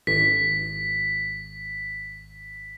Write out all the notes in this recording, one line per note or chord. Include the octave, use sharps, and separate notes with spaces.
G#1 B6